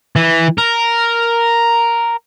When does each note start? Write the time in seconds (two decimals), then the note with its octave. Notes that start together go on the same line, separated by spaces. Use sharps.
0.16 E3
0.58 A#4